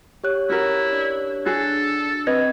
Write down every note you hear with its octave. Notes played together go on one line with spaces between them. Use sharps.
G4 C#5 F#6
C#4 E4 F#4 A#4
D4
F#4 G#4 A4
C4 B4 D#5 G#6 A#6